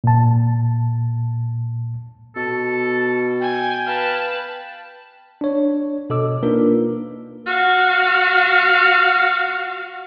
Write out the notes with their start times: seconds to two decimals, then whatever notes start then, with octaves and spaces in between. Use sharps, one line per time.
0.04 A#2 A5
2.36 B2 A4
3.42 G5 G#5
3.87 B4 F5 A5
5.41 D4 C#5
6.10 B2 A4 D#5 D6 E6
6.43 A#3 D4 D#4 F4 A#4 B4
7.46 F#4 F5